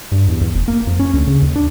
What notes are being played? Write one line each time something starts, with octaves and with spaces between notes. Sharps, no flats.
G2
E2
E2
F1
A#3
F2
C#4
D2
C#3
D#2
D4